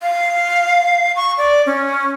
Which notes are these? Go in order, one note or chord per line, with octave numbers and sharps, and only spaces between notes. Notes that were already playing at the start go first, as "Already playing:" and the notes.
F5
C#6
D5
C#4